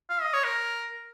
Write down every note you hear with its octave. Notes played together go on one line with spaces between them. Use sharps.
F5
D#5
C#5
A#4